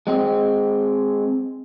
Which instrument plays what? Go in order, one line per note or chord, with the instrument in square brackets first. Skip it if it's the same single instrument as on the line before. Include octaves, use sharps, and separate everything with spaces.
[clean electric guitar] G#3 C4